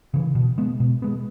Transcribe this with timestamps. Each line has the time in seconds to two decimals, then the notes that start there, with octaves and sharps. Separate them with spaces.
0.14 C#3 E3
0.35 B2
0.58 G#3 B3
0.80 B2
1.02 G#3 B3